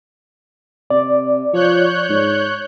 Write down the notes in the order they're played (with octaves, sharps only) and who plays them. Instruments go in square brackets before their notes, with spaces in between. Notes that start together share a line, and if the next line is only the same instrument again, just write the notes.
[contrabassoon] C3 [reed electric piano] D5
[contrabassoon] F3 [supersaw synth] C#5 F#6 G6
[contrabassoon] G#2